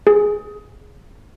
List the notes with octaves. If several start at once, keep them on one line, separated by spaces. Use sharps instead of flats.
G#4